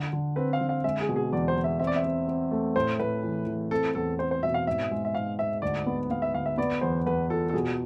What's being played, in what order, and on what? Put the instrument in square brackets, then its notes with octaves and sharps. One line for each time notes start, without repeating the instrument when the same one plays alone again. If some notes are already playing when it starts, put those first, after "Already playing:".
Already playing: [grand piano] D3
D3
[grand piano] C4 [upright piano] B4
[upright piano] F5
[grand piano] D3
[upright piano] F5
[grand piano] G#3 [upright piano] E5
[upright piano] G#4
[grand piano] B2
[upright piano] G#4
[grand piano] E2 [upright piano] D5
[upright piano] C5
[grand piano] E2
[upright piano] E5
[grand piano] C4 [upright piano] E5
[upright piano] D5
E5
[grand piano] C4
C4
A3
[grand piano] A2 [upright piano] C5
[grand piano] A2 [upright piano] B4
[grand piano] E3
E3
[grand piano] C4 [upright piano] A4
[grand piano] E2 [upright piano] A4
[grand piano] C4 [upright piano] C5
[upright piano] C5
[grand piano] B2 [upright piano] E5
[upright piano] F5
[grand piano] G#2 [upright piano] E5
[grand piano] G#3
[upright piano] E5
[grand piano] G#2 [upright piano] F5
[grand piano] G#2 [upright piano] E5
[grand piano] D2 [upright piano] D5
[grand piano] B3
[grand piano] B3 [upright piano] F5
[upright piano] E5
[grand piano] D2 [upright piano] F5
[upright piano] E5
[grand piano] B3 [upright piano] D5
[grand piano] E2 [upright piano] C5
[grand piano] E2 [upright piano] B4
[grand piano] F4 [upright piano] A4
[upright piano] A4
[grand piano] B2 [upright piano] G#4